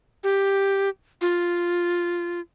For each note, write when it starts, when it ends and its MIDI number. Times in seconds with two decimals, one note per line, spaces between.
0.24 0.89 67
1.21 2.40 65